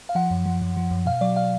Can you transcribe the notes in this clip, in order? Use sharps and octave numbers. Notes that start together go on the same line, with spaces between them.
F5
F3 F#5
F#2
F3
F#2
F3
F#2
B2 F5
F#3 D5
F5